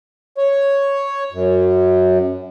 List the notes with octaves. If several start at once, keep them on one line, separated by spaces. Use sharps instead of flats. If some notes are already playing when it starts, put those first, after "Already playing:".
C#5
F#2